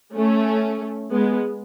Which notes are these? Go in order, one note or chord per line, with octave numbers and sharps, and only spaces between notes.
A3 C#4
G#3 B3